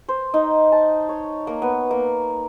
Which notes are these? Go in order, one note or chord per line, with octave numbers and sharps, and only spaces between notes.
C5
D#4
A5
C#5
A#3
B3
A#3